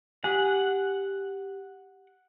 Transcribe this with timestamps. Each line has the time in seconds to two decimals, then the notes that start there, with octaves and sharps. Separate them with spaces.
0.24 G4 F#5 G#5